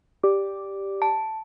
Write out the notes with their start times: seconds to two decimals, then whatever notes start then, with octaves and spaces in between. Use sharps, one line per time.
0.23 G4 D5 D6
1.02 A5